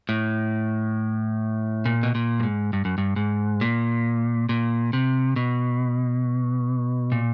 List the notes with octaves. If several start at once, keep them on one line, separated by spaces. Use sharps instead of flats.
A2
A#2
B2
A#2
G2
G#2
G2
F#2
G2
G#2
A#2
A#2
C3
B2
A#2